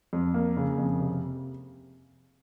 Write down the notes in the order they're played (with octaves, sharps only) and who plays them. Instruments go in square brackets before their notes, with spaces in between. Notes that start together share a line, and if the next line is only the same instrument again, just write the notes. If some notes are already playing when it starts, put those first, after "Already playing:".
[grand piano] F2
A#3
C#3
F2
C3